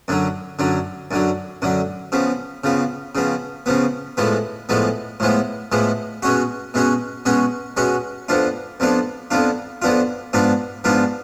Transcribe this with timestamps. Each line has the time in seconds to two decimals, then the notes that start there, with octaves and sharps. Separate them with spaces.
0.08 F#2 D3 F#3
0.59 F#2 D3 F#3
1.11 F#2 D3 F#3
1.62 F#2 D3 F#3
2.12 C#3 F3 B3
2.64 C#3 F3 B3
3.15 C#3 F3 B3
3.66 C#3 F3 B3
4.17 A2 F3 G#3 B3
4.69 A2 F3 G#3 B3
5.20 A2 F3 G#3 B3
5.72 A2 F3 G#3 B3
6.23 B2 G#3 C#4 F#4
6.74 B2 G#3 C#4 F#4
7.25 B2 G#3 C#4 F#4
7.77 B2 G#3 C#4 F#4
8.28 F2 F3 B3 D4 F4
8.80 F2 F3 B3 D4 F4
9.31 F2 F3 B3 D4 F4
9.82 F2 F3 B3 D4 F4
10.33 G#2 F3 B3 D4 F4
10.84 G#2 F3 B3 D4 F4